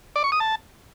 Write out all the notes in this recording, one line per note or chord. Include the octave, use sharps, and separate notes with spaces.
D5
C#6
D#6
A5